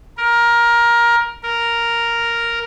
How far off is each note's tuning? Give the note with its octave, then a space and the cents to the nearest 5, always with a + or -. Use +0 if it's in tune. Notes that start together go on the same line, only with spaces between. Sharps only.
A#4 +15
A#4 +0